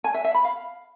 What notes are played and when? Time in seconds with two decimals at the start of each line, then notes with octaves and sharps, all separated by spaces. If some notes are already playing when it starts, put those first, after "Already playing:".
0.04 G#5
0.14 E5
0.24 E5
0.34 B5
0.45 F5